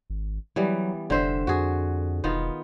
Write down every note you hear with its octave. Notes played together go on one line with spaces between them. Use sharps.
G#1
E3 F#3 G3 B3
F1 D3 C5 E5
F2 F#4 G#4
E1 D#3 B3 F4